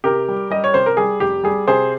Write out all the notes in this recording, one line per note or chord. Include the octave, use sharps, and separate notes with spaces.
C3 G4 A#4
G3
G3 D#5
C#5
C3 C5
A#4
G3 G#4
F1 G4
G3 G#4
C3 G#4 C5